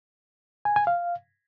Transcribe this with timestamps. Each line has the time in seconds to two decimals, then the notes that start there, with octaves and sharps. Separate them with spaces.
0.65 G#5
0.76 G#5
0.87 F5